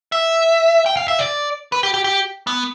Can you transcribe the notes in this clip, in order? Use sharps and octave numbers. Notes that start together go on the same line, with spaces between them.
E5
G5
F5
E5
D5
B4
G4
G4
G4
B3